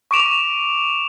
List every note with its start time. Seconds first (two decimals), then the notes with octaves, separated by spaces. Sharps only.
0.11 C#6 D6 D7 E7 F7